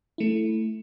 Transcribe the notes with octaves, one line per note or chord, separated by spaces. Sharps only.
A3 E4